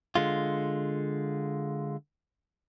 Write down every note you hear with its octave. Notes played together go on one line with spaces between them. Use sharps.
D3 G#3 F4